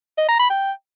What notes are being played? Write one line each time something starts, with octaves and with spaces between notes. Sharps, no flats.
D#5
A#5
B5
G5